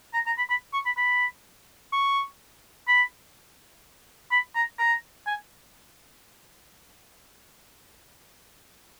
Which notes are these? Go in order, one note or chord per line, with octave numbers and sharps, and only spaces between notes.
A#5
A#5
B5
B5
C#6
B5
B5
C#6
B5
B5
A#5
A#5
G#5